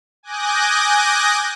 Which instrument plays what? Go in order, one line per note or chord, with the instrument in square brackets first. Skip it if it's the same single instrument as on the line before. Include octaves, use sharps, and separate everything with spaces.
[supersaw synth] G#5 D6 D#6 F#6 G6 A#6